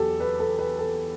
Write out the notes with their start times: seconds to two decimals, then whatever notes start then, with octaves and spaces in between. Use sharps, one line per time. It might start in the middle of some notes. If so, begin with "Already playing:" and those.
Already playing: E2 F#3 G4 A4
0.20 B4
0.40 A4
0.59 B4
0.79 A4